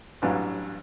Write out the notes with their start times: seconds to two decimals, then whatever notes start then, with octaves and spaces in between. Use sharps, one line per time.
0.22 A1 G2 E3 F#3 F5